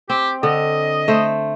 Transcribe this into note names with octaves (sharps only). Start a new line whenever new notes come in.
C4 G4
D3 D#5
A3 C5